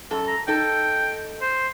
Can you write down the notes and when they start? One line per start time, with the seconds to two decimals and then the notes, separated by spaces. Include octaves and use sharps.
0.11 F#2 A4
0.28 A#5
0.48 D#4 A4 G5
1.41 C5